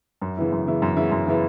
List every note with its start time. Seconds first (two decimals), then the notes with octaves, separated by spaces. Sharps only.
0.22 F#2
0.37 C#3 E3 B3 E4
0.52 F#2
0.66 C#3 E3 B3 E4
0.82 F#2
0.96 C#3 E3 B3 E4
1.11 F#2
1.27 C#3 E3 B3 E4